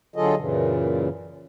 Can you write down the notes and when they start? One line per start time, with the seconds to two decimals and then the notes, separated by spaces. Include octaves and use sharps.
0.16 D3 F#3 F4 G#4 A4 D#5
0.38 F#2 A#2 C#3 E3